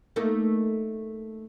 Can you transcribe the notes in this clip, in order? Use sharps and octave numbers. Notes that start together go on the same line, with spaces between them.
A3 A#3 D#4